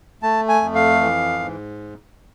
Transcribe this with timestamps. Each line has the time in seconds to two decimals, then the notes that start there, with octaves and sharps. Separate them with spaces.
0.23 A3 A5
0.49 G#5
0.62 F2
0.75 F5
1.01 E3
1.39 G#2